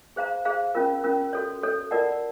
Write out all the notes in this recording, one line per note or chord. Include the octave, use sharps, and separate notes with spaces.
G#4 C5 F5 A#5
G#4 C5 F5 A#5
C#4 F4 A#4
C#4 F4 A#4
F#4 A4 C#5
F#4 A4 C#5
F4 A#4 D5 F#5 A5